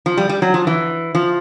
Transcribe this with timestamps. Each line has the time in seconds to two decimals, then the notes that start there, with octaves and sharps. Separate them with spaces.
0.06 F3
0.17 G3
0.29 G3
0.42 F#3
0.54 F3
0.67 E3
1.15 F3